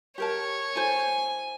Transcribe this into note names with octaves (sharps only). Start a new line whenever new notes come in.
G4 A#4 C#5 A5
E4 A4 C5 G#5